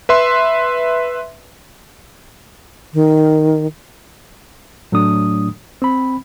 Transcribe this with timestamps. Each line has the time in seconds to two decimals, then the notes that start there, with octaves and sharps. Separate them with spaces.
0.09 B4 E5 C6
2.94 D#3
4.92 A2 F#3 A3 D4 D#6
5.82 C4 B5